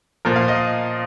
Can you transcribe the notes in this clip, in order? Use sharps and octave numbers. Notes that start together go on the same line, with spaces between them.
A#2 F3 A#4
F5
D#5